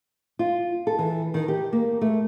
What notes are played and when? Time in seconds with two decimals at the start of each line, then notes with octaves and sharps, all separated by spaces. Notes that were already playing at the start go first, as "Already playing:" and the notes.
0.39 F4
0.87 A4
0.99 E3
1.34 D#3
1.48 G4
1.73 A#3
2.01 A3